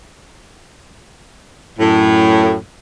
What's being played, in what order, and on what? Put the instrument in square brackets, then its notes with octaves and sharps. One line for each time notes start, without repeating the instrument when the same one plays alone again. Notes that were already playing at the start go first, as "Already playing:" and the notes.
[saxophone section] F#2 A2